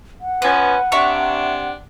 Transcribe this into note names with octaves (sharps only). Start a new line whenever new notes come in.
F#5
F3 B3 C#4 B4
C3 D4 E5 A#5 C#6